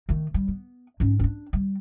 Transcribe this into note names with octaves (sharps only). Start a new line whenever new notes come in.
D#3 A3
G3
B3
G#2 C#4
C#4 D4
G3